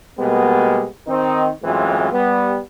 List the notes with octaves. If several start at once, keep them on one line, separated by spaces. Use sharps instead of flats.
B2 G3 G#3 A#3 B3
D#3 C4 D#4
F#2 A2 E3 G#3 C4 F4
G3 B3